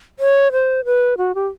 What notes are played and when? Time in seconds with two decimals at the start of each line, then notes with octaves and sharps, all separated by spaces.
0.20 C#5
0.52 C5
0.85 B4
1.17 F#4
1.35 G4